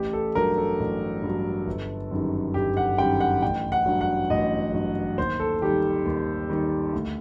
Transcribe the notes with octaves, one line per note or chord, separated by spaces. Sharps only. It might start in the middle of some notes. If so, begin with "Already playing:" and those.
Already playing: A1 G4
A4
G2 F#3 A#4
A4
A1
G2 F#3
G1
F#2 D#3 G3
G1 G4
F#5
F#2 D#3 G3 G5
F#5
A1 G5
F#5
G2 F#3
F#5
A1 D#5
G2 F#3
D#2 C5
A4
D#3 G3 G4
D#2
D#3 G3
D2